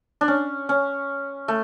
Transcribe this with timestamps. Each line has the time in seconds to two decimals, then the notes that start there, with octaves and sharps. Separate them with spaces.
0.21 D4
0.28 C#4
0.69 C#4
1.48 A3